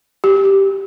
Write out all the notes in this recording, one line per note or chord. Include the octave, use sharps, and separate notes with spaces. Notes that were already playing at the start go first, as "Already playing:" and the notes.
G4